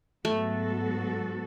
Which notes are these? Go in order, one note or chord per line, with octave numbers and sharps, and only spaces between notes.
G#2 F#3 A3 B3 F#4 A4